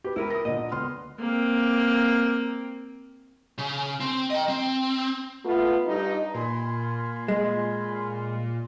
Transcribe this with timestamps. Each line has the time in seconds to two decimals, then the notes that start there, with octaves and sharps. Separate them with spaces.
0.04 G4 B4
0.16 C#2 E4 A#4 B4
0.30 D#6 A#6
0.45 A#2 D3 D#5
0.72 C#2 B3 C6 F6
1.20 A#3 C4
3.58 C#3
4.00 C4
4.30 D#5 G5
4.49 C4
5.44 A3 B3 F4
5.87 G2 D#4
6.34 A#2 G#5 B5 C6
7.28 G#3